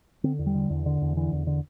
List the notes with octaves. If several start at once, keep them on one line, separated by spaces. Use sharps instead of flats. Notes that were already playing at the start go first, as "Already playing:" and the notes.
D3 C4
E2
G3
D3
E2
D3
E2
D3 E3
E2
D3